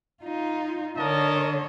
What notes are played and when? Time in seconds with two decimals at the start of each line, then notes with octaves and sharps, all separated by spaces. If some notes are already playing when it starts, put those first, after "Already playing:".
0.23 D#4 F4
0.97 D3 A#4 C#5 D#5 A5